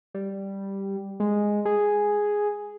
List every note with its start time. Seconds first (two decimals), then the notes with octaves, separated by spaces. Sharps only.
0.14 G3
1.20 G#3
1.65 G#4